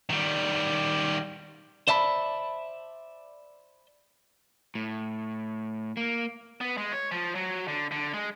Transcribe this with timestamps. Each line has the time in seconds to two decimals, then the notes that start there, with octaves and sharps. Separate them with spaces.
0.10 D#3 G3
1.88 C5 D5 E5 A5 B5
4.75 A2
5.97 A#3
6.61 B3
6.78 G#3
6.92 C#5
7.12 F3
7.35 F#3
7.68 D3
7.92 D3
8.14 G#3